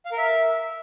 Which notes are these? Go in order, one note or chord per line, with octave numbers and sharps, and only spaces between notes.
F5
A#4
E5